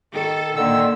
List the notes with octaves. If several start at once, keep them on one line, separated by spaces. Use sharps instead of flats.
D#3 A4
A#2 D3 D#3 E6